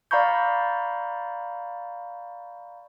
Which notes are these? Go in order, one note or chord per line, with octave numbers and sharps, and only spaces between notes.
D5 F5 A#5 B5 C#6 G6